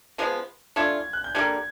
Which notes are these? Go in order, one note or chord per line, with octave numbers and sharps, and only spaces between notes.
C#3 F3 G#3 B3
A3 D4 F4 G#6
F#6
G6
D3 G3 A#3 G#6